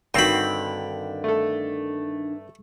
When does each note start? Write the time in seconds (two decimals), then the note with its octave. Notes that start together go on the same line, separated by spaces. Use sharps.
0.14 G2 D3 D#3 C4 F#4 G5 B5
1.24 A3 A4